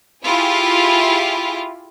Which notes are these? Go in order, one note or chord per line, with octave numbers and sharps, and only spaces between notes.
E4 F4 G4 G#4